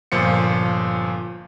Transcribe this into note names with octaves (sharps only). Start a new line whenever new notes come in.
G1 A#2 F3 F4 C#7